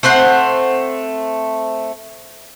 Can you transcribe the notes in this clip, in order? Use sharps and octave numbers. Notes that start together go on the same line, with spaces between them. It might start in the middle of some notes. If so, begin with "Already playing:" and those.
A3 C4 C5 F#5